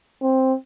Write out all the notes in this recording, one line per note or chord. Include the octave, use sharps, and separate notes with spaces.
C4